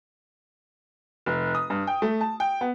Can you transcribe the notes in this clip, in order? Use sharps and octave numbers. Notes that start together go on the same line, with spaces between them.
F1
D#6
G2
G5
A3
A5
G5
B3